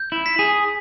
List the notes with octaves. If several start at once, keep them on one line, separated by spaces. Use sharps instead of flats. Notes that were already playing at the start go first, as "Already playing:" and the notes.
Already playing: G6
E4
B6
G#4